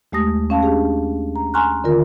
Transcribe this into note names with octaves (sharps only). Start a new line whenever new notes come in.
D#2 G#3 A3 G4 D#6 A#6
C#4 F5 A5 B5
D4 G4 G#4
A#5
G#5 A#5 C6 C#6 F6 F#6
D3 D#3 F4 A#4